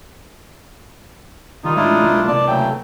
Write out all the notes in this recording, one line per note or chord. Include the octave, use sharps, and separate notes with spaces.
D#3 G3 D#4 F4
A1 G#3 D4 E4 F4
B1 G#3 A#3
C3 A#3 D5 A5
C#3 F#3 A3 G5